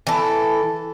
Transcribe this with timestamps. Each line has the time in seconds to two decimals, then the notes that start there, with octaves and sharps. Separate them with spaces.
0.07 E3 A4